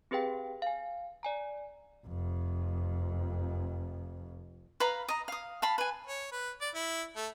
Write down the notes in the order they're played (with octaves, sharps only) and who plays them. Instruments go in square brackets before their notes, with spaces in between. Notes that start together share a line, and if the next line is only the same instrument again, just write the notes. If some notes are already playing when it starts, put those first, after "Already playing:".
[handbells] C4 G4 G#4 B4 F5 G5
F5 G#5
D5 G#5 A#5
[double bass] F1 F2
[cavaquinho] B4 F5 A#5 B5
D#5 A#5
F5 D#6
F5 A5 B5
B4 G#5
[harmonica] C#5
B4
D5
E4
A3